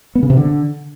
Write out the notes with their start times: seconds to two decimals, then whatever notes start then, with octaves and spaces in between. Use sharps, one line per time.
0.15 B3
0.23 C#3
0.30 C3
0.37 D3